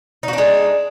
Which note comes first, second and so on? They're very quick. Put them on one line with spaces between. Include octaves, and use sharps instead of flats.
D#4 F#4 D4 G#3